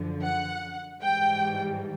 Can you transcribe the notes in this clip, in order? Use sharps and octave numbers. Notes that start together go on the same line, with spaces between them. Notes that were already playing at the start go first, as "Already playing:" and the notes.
Already playing: F#2 D3 F3
F#5
G#2 E3 G3 G5